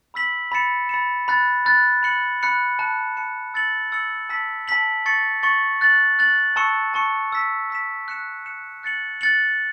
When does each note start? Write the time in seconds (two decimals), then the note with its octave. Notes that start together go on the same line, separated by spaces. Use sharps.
0.14 B5 E6 B6 F#7
0.51 B5 A6 C#7 E7
0.89 B5 A6 C#7 E7
1.28 B5 F#6 A6
1.65 B5 F#6 A6
2.03 B5 F#6 C#7 F#7
2.41 B5 F#6 C#7 F#7
2.79 A5 F#6 C#7 E7
3.17 A5 F#6 C#7 E7
3.54 E6 A6 C#7 F#7
3.92 E6 A6 C#7 F#7
4.29 A5 E6 B6 F#7
4.68 A5 E6 B6 F#7
5.06 C#6 A6 C#7 F#7
5.43 C#6 A6 C#7 F#7
5.81 F#6 A6 F#7
6.19 F#6 A6 F#7
6.56 A5 C#6 E6 C#7 E7
6.94 A5 C#6 E6 C#7 E7
7.32 E6 B6 E7
7.70 E6 B6 E7
8.08 F#6 C#7 E7
8.46 F#6 C#7 E7
8.83 F#6 A6 C#7 F#7
9.21 F#6 A6 C#7 F#7